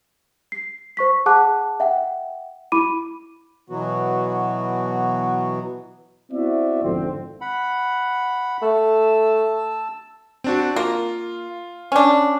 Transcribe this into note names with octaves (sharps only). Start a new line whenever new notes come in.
C7
C5 C#6 B6
G#4 F#5 A5 D6 F#6
E5 F#5 G5
E4 B5 D6 D#7
B2 E3 F#3 B3 F#4
B3 C4 E4 F#4 D5 E5
G#1 F2 D3 C4
F#5 B5
A3 A5 E6
C4 D4 F#4
A#3 F4
C#4 D4